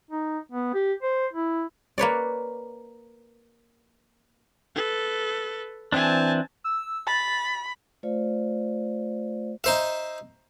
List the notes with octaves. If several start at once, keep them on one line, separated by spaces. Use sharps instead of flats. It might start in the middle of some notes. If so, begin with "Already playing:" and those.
D#4
B3
G4
C5
E4
A#3 B4 C#5 D5
A4 B4
E3 C4 D4 G#5 A5
E6
B5 A6
A3 F4 C5 D5 F5
D#4 C5 E5